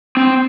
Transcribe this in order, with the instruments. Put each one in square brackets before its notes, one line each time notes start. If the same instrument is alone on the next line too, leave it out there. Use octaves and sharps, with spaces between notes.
[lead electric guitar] C4